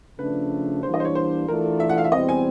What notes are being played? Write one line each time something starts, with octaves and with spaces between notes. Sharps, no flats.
C#3 F3 A3 D4 B4
E3 G3 A#3 D4 C5
D#5
C5
C#5
C5
E3 A3 D4 F4 A4 A#4
E5
F#5
F5
E5
E2 B2 G3 C4 D#5
G#5